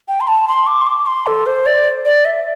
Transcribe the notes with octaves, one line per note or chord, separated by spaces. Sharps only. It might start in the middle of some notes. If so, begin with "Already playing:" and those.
G5
C6
A5
C6
D6
C6
D6
C6
A4
C5
D5
D5
E5